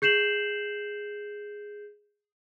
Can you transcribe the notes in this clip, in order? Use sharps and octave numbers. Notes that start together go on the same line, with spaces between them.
G#4 G6 C7 E7 F#7